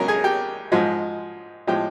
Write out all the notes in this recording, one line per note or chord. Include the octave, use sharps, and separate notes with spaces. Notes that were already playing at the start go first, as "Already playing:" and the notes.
Already playing: C#2 C#3 F#3 A#4
G#4
G4
G#2 F3 G#3
A2 F3 G#3 G4